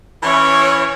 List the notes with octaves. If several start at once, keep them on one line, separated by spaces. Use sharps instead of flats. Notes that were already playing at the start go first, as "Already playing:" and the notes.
E3 C#4 E4 C#5